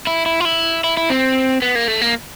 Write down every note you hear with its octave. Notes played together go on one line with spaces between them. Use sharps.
E4
E4
F4
E4
E4
E4
C4
B3
A#3
A3
A#3